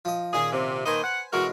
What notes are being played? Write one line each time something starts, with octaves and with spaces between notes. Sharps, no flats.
F3 D#5
A#2 D#3 C#4 G#4
C3
D#3 A#3 B4 C5 D#5 G#5
F#5
A1 B2 G#3 F#4 A#4